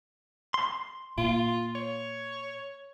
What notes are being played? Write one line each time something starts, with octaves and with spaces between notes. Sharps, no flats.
C6
A#2 F4
C#5